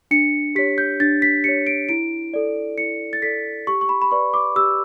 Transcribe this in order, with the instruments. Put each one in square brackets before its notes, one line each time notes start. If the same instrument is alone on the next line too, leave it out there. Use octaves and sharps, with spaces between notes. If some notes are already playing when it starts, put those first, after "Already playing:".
[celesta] D4 C#7
G4 C#5 B6
G6
D4 A6
B6
G4 C#5 C#7
D7
E4 D7
A4 D5
E4 C#7
A6
A4 D5 B6
G4 C#6
C#6
B5
B5
B4 D5 C#6
D6
G4 E6